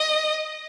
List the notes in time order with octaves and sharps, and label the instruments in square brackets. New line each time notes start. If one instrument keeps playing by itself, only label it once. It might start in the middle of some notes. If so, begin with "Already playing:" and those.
Already playing: [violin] D#5